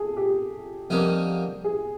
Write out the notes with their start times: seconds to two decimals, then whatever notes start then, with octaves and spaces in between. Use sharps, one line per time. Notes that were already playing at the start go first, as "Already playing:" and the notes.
Already playing: G#4 A4
0.17 G4
0.90 F2 D3 G3 A#3 D#4
1.64 G#4